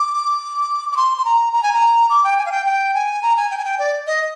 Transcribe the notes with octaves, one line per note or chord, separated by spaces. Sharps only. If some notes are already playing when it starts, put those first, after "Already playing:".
Already playing: D6
D6
C6
C6
A#5
A#5
G#5
A#5
D6
G5
G#5
F5
G5
G5
G#5
A#5
G#5
G5
G#5
G5
D5
D#5